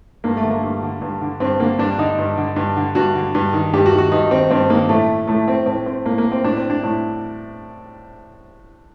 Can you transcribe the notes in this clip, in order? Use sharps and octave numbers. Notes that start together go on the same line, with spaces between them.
G2 A#3
A3
D3
A#3
G2
D3
G2
D3
G2 C4
D3 A#3
G2 D4
D3 D#4
G2
D3
G2
D3
G2 F#4
D3
G2
D#3
G2 G4
F#4
D#3
F#4
G2 D#4
D#3 C4
G2 C4
D#3 A#3
A2 A3
A2 A3
C4
A2 C4
C4
A2 A#3
A#3
C4
A2 D4
C4
D4
A2